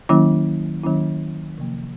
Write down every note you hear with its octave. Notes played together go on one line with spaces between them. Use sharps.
D#3 F#3 A#3 C#4 E4
D#3 F#3 A#3 C#4 E4
C3 F3 A#3